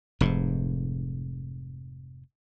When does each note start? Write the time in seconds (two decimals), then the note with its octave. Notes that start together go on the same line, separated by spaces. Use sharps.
0.21 F1 G#2